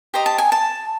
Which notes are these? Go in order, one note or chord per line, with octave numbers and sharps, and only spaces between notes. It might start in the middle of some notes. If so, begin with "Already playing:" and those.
G4 C5 D#5 A#5
A5
G#5
A5